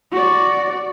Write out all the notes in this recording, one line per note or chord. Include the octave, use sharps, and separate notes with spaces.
F#4 D5